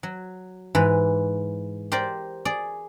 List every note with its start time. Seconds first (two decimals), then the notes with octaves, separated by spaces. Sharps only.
0.03 F#3
0.75 G#2 E3 B4
1.92 G4 A#4 C5 D5
2.45 G#4 D5